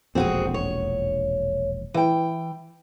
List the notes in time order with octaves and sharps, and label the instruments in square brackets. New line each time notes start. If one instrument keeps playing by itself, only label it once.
[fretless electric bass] E1 A#1 F2 [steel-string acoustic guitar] C4 F#4 G#4
[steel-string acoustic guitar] C#5
E3 G5